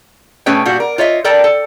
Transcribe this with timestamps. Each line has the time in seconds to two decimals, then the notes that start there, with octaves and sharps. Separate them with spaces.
0.46 B2 A3 C#4 G#4 B4 G5
0.66 A#2 G3 F#4
0.80 A#4
0.98 F4 C#5 D#5 E5
1.24 A4 A#4 D5 G5 A5 A#5
1.44 A4